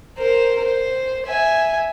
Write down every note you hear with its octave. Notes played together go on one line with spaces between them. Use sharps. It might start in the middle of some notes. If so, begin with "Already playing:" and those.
A#4 C5
C5
E5 G#5